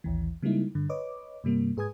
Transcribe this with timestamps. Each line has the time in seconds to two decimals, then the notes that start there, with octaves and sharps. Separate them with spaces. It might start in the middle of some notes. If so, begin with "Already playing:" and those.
0.04 A1 D#2 E3
0.43 C#3 G3 G#3 A#3 D#4 E4
0.75 G2 D3
0.89 B4 C#5 D#5 D6
1.44 G2 C3 G3 A#3
1.77 G#2 G#4 B4 G#5 D#6 G#6